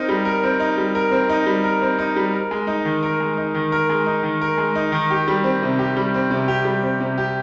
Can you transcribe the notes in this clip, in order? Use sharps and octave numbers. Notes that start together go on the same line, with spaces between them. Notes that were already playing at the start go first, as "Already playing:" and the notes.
Already playing: C4 D#4 A#4
G3
A#4
C4
D#4
G3
A#4
C4
D#4
G3
A#4
C4
D#4
G3
A#4
G#3
D#4
D#3
A#4
G#3
D#4
D#3
A#4
G#3
D#4
D#3
A#4
G#3
D#4
D#3
G4
G3
C4
C3
G4
G3
C4
C3
G4
G3
C4
C3
G4